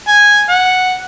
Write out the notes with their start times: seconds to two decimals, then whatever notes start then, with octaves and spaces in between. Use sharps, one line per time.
0.08 G#5
0.49 F#5